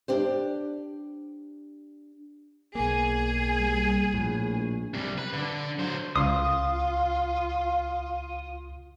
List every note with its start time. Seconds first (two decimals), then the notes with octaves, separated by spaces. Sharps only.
0.08 D4 G4 C5
2.75 B1 A#3 G#4
3.59 G3
4.14 A#1 A2
4.94 C3 G3
5.18 B4
5.33 D3
5.79 F#3 C5
6.16 C#2 F4 C6 D#6